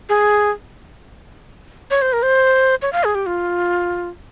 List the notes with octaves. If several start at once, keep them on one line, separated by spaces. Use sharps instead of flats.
G#4
C#5
C5
A#4
C5
C#5
F5
G#4
G4
F4